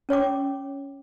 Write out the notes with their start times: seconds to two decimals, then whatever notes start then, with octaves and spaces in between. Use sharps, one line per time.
0.09 C#4 C#5 G5 D6